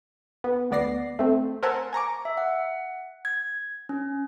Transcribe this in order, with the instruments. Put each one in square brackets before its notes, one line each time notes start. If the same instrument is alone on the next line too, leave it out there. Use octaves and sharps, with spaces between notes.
[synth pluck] B3
D2 B3 D5 A#6 C7
A3 C4
A#4 C5 E5 F#5 G#5 A5
G#5 A#5 C#6 D6
[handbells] E5
F#5
G#6
C#4